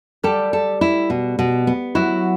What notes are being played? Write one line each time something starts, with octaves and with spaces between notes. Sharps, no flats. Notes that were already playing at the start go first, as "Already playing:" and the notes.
G3 G4 A4
A4
E4
B2
B2
B3
F#3 E4 F#4